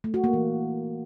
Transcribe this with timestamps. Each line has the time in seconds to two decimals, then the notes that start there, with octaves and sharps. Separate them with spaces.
0.04 A3
0.14 F#4
0.24 A#3
0.33 E3